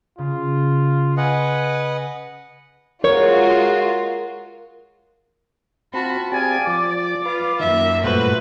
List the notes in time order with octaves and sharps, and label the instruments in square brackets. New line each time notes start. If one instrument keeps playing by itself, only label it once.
[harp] C#3 [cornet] F4
[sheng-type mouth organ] B4 D#5 F#5 [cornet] G#5
[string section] G#3 F4 [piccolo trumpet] F#4 [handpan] A#4 [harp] C#5
[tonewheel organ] C4 [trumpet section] F4 A5 B5 [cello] F#4
[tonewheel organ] C4 G4 [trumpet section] G#4 F5 G#5 [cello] D5
[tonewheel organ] F3 [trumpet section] D6
[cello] F4 [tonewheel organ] B4 F5
[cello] F#2 A#3 [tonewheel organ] D#3 [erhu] E5
[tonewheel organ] G2 A#2 A3 [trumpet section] F4 F#4 C5 [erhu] B4